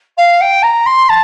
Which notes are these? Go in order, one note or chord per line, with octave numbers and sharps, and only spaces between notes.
F5
G5
A#5
C6
A5